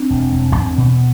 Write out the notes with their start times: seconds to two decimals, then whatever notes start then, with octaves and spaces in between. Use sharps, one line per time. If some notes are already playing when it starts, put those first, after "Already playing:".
Already playing: C4 D4
0.10 E1
0.32 E1
0.55 E2
0.78 B2